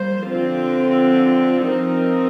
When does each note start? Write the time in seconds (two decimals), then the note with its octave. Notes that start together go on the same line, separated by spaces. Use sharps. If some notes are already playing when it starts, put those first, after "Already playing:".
Already playing: G3 A#3 C5
0.28 D3 F3 C4 F4
1.67 F3 C4 D#4 A#4